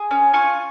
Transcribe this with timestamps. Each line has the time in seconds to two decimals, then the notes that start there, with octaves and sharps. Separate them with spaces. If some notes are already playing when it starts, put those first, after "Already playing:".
Already playing: G#4
0.11 C#4
0.33 F4 G#5 C#6